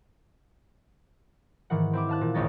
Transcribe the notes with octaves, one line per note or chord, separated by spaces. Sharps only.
G#2 D#3 E3 F#5
C4 E4 D6
F5 A5 F#6
A#2
G#1 C#2 G#3 C#4 D#4 A6